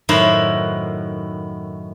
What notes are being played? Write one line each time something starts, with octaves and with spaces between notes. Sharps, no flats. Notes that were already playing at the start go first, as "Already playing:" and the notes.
F#2 A2 D#3 E4 F#4 C5